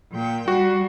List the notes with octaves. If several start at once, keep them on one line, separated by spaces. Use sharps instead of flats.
A#2 G5
G3 F#4